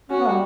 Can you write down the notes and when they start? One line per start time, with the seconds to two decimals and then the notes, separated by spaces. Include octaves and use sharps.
0.10 C#4 F#4
0.19 B3
0.29 G3